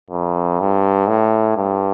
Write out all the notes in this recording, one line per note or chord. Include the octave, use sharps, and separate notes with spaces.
F2
G2
A2
G2